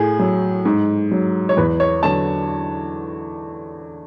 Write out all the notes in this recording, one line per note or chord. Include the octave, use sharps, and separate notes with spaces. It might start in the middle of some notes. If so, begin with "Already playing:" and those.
Already playing: A2 G#4
F#3
G#2
F#3
C#5
E2 B4
C#5
D3 F#3 A5